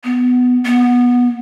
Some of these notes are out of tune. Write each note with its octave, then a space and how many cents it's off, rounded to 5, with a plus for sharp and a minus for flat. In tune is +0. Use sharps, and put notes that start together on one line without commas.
B3 +10
B3 -15